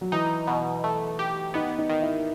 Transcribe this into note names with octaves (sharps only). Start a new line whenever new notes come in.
F#3
E3 D#4
B2
A3
G4
B3 D#4
D#4
D#3
E4